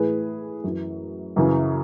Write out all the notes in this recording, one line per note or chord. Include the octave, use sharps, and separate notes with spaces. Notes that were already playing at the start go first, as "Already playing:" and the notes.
Already playing: A2 E3 G#4 B4
F#2 E3
F#2 C#3 E3